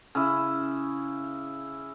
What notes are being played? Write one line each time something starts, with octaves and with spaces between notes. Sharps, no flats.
C#3 E4